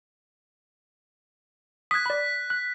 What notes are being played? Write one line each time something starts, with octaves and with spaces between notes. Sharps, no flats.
D#6 F#6 G#6 B6
D5 B5
F#6